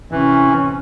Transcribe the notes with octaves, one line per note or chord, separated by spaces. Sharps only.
C3 E3 C#4